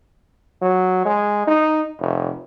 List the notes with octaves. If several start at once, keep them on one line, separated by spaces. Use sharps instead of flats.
F#3
G#3
D#4
F1